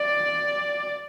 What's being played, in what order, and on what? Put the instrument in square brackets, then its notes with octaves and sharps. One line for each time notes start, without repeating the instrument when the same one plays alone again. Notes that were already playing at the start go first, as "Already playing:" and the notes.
Already playing: [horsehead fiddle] D5